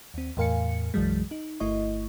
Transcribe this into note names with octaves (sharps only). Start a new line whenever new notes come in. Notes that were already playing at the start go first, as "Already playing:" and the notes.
D#2 C4
E2 A2 A#4 F5 G#5 C#7
B1 F#2 E3 F#3 G#3
D#4
G1 A3 E4 D#5 C#6